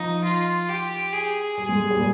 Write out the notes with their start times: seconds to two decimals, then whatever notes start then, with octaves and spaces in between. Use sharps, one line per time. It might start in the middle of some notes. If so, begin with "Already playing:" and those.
Already playing: F3 D#4
0.24 F4
0.69 G4
1.13 G#4
1.58 G3 G#4
1.69 G#3
1.80 G#3
1.91 G3
1.98 A#2